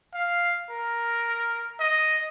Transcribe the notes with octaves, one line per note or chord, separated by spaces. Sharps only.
F5
A#4
D#5